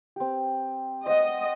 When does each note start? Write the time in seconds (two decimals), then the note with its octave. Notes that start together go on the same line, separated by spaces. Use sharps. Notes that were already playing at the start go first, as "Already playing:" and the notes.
0.16 C4 G4
1.06 C5 D5 D#5 F#5